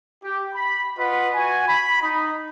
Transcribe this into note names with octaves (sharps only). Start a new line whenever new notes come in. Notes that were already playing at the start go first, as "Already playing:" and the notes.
G4
B5
F4 B4 D#5 F#5 B5
F#4 G#5
B5
D#4